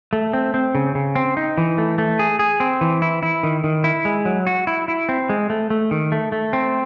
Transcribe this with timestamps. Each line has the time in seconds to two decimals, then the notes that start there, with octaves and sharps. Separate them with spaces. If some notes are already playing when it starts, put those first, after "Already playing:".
0.13 A3
0.33 C4
0.54 C4
0.75 C#3
0.95 C#3
1.15 C4
1.37 D#4
1.58 E3
1.78 A3
1.98 A3
2.19 G#4
2.39 G#4
2.60 C4
2.81 E3
3.02 E4
3.23 E4
3.43 D#3
3.64 D#3
3.84 E4
4.05 G#3
4.25 F#3
4.47 F#4
4.67 E4
4.88 E4
5.09 C4
5.29 G#3
5.50 A3
5.70 A3
5.91 D#3
6.12 A3
6.32 A3
6.53 C4